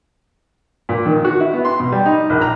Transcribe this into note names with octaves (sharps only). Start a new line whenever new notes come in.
A#2
D#3
F#4
E4
B3
C6
B2
G3
D#4
A#1
A#5